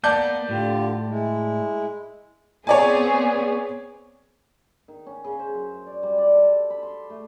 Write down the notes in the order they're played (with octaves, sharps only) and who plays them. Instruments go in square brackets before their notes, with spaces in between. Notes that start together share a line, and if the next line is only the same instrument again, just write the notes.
[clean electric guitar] A#3 B3 [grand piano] D5 A5 G6
[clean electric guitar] A2 [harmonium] D3 F4 G4
[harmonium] G#3 E4
[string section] B3 C4 G#4 [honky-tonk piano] C#5 D5 G#5
[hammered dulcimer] D#3
C#4
C#3
C5
F#2
D5
G3
D5
A4
B5
C6
A3